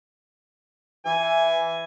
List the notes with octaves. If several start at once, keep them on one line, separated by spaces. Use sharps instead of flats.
E3 G#5